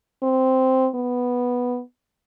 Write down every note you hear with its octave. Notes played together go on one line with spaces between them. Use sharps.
C4
B3